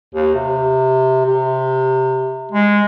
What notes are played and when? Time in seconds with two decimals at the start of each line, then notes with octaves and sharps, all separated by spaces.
0.15 D#2
0.35 C3
1.25 C3
2.52 G#3